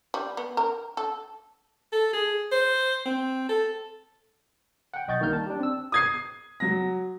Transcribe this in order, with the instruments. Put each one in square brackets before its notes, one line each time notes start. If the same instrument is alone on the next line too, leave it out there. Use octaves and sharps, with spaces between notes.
[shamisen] G3
B3
A#4
A4
[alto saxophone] A4
G#4
C5
C4
A4
[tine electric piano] F#5 G5
B1 D#5 C#6 G6 A6
D#3 G3 A#3 F6 G6
A5
D4 G4
C4 E6
[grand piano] D#6 G#6 C7
F#3 A#6